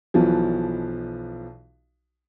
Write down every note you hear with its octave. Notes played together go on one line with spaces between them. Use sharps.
B1 B2 E3 F3